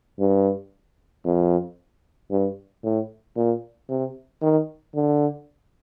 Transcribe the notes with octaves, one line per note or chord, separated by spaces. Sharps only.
G2
F2
G2
A2
A#2
C3
D#3
D3